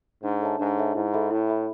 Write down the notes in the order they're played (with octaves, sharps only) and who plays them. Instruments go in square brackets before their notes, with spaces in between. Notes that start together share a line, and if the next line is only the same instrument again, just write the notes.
[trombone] G#2 [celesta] D4
[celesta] A4 C#5 E5 A5
[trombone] G#2 [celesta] D4
[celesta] A4 C#5 E5 A5
[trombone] G#2 [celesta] E4
[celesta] A4 E5 B5
[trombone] A2 [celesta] E4
[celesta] A4 E5 B5